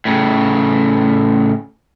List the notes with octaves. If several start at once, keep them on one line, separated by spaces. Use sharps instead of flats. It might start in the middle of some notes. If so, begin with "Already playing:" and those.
A2 C#3